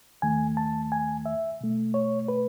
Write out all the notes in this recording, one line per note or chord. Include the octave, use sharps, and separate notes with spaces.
D#2 D#3 A3 G#5
A5
G#5
E5
B2 A3
C#5
B4